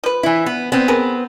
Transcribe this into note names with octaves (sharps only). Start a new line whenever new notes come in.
F3 B4
E3 E4
B3
B3 C4
G#4 A#4 B4